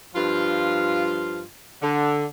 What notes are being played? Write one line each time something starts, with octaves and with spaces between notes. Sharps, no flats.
G2 F3 F4
D3